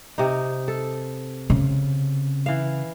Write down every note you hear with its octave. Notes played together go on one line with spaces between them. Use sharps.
C3 D#4
A4
C#3
E3 F5